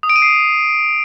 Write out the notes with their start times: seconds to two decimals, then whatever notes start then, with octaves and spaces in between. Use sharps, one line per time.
0.03 D#6
0.09 D7
0.16 D#7
0.22 C7
0.28 D#7